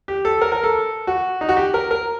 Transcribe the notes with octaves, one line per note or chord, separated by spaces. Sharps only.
G4
A4
A#4
A#4
A4
F#4
D#4
F#4
G4
A#4
A#4